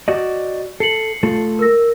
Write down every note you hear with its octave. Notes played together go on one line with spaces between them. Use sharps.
F#4 D5 D#5
A4 C7 C#7 F#7
A3 F4 A4
A#4 E6 A#6